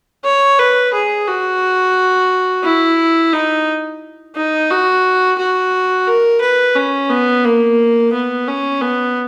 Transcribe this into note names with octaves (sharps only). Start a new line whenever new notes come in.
C#5
B4
G#4
F#4
E4
D#4
D#4
F#4
F#4
A#4
B4
C#4
B3
A#3
B3
C#4
B3